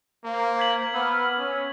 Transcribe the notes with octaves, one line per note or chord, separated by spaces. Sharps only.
A#3 C5 F5
G#6 B6 F#7
B3 B5 D6 E6 F6
C#4 E6